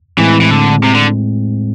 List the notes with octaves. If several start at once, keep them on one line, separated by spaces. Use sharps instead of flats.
A2 E3 G#3 C4
E3
D3
C3
D3